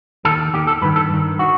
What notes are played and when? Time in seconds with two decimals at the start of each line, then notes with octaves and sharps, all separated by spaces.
0.25 D#2 D#3 A4
0.54 D#2 D#3 G4
0.67 A4
0.82 G2 B4
0.85 D#3
0.96 A4
1.10 G2 D#3
1.39 D#3 F#4